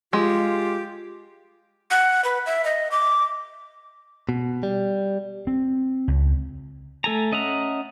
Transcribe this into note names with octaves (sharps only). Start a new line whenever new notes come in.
G#3 F4 G4
F#5
B4
E5
D#5
D6
B2
G3
C4
C#2
A3 A4 G#5 A#5
C#4 D#5 E5 F#5 A#5